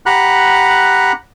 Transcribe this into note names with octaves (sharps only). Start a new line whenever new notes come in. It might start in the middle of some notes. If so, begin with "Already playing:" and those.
G4 F#5 A#5 B5 F#6